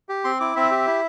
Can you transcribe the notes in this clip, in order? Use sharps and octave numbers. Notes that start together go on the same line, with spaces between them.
G4
C4 C6
E4 D6
C4 E5
G4
E4